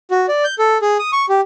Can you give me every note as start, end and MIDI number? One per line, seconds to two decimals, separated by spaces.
0.11 0.26 66
0.28 0.44 74
0.44 0.55 91
0.59 0.78 69
0.82 0.97 68
0.99 1.11 87
1.12 1.26 85
1.29 1.41 67